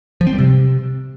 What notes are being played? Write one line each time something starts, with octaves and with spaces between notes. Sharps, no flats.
F3
C4
G3
C3